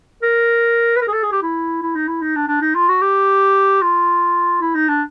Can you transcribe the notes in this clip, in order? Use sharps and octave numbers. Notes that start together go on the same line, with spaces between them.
A#4
B4
A#4
G#4
A4
G#4
G4
E4
E4
D#4
E4
D#4
D4
D4
D#4
F4
F#4
G4
F4
E4
D#4
D4